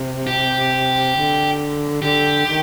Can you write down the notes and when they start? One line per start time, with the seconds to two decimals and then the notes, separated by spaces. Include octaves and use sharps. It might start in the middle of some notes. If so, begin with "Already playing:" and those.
Already playing: C3
0.27 G4
1.15 D3
2.02 D3 G4
2.46 D#3